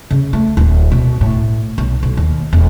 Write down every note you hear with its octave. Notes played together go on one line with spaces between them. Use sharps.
C#3
A3
D1
B2
A2
B1
B1
D#2
E1